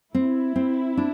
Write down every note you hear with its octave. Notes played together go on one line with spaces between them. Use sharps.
C4 E4
C4
D4